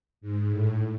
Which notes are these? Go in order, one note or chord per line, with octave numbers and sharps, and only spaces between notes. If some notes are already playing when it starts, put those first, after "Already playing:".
G#2
A2